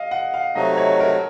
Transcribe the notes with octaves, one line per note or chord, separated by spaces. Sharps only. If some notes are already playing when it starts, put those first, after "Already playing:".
Already playing: D#5 F5
F#5
F5
C3 F#3 A3 D#4 F#4 D#5
C#5
A#4